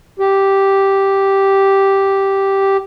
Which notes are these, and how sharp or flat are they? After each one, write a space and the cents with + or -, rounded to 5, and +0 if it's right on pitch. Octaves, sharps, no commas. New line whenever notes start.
G4 -5